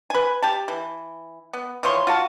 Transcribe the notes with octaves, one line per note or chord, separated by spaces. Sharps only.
B4 G#5
G4 A5
E3
B3
E3 F3 C#5 C6
F4 F#4 A5